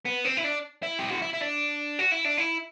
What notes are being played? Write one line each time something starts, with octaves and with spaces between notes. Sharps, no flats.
B3
C4
E4
D4
E4
G4
F#4
E4
E4
D4
F#4
E4
D4
E4